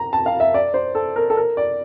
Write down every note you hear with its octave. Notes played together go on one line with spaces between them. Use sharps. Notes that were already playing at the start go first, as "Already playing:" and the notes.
Already playing: A#5
A5
F5
E5
D5
C5
A4
A#4
A4
A#4
D5